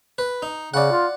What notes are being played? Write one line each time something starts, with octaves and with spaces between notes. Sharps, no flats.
B4
D#4
C#3 D5 F#5
F4